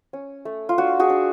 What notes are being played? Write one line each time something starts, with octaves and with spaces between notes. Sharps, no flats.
C#4
A3
F4
D4 F#4
F#4 G#4
D4